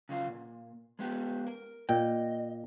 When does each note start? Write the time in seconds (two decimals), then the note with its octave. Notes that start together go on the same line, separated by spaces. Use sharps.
0.09 C#3 F#3 F4
0.28 A#2
0.99 G#3 B3 G4
1.47 A#4
1.89 A#2 D#5 G5